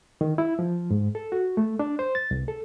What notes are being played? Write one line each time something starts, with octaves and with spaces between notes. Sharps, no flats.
D#3
E4
F3
G#2
A4
F#4
A3
D4
C5
A6
C2
A4